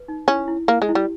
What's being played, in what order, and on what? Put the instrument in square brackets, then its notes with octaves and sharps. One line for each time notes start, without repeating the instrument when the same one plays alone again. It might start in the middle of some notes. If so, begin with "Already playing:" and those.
Already playing: [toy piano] B4
D#4
[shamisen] C#4 [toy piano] E4
[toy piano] E4
[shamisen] A#3 [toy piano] E4
[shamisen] G#3
[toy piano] E4
[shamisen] G3